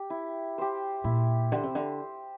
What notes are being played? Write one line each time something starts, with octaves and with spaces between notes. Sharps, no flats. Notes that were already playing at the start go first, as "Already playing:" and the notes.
Already playing: G4
E4
G4 C5
A#2 E4
D3 G4 C5
C3
D3